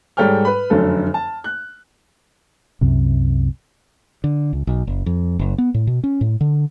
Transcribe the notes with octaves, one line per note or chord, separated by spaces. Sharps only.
G#2 G3 A4 C#5 G5 F6
B4 B5
F1 F#2 D3 A4
A5
F#6
C2 F#2 C3
D3
C#2
B1
F#1
F2
F#1
B3
A2
B2
C#4
A2
D3